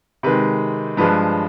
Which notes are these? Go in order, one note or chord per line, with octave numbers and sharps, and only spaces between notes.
C3 D#3 G#3 B4
G2 F3 G#3 B4